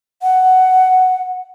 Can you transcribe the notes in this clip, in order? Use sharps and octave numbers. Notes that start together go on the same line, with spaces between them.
F#5